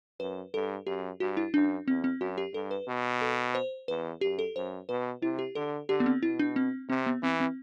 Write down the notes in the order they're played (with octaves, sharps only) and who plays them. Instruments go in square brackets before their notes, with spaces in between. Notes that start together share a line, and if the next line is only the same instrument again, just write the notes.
[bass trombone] F#2 [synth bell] B4
[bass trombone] G2 [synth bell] A4
[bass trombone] F#2 [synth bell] G4
[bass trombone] G2 [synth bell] F#4
[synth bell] E4
[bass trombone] F#2 [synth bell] D4
[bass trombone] E2 [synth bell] C4
[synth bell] C4
[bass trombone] F#2 [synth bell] F#4
[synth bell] G4
[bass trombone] G2 [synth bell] A4
[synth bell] B4
[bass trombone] B2
[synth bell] A4
C5
[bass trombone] E2 [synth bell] B4
[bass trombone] F#2 [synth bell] G4
[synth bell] A4
[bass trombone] F#2 [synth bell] C5
[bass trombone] B2 [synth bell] B4
[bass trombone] C3 [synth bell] E4
[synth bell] G4
[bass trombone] D3 [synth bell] A4
[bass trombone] D3 [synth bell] G4
[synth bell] B3
C4
[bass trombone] B2 [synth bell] E4
[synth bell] D4
C4
[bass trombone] C3 [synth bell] C4
[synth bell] B3
[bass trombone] E3 [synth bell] C4
[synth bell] C4